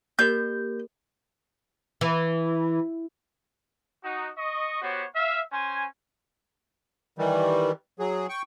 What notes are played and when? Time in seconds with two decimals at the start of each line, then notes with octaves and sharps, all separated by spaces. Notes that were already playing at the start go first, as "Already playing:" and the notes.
0.19 A#3 G4 A#4 G6
2.01 E3
4.04 D#4 F#4
4.38 D#5 C#6
4.82 B3 F#4 G4 C5 C#5
5.15 E5 F5
5.52 C#4 C5 G#5
7.18 D#3 E3 G3
7.99 F#3 G#4
8.29 G5 C#6